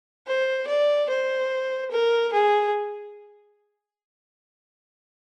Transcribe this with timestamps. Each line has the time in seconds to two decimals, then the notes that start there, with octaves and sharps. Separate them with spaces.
0.27 C5
0.67 D5
1.09 C5
1.91 A#4
2.32 G#4